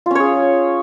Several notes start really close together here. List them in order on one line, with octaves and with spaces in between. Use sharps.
F4 C#4 C#5 G#4